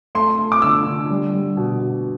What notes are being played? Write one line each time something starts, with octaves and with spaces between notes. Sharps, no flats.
A3 C6
A3
D6
D3 E6
D3
G3
G3
B2
B2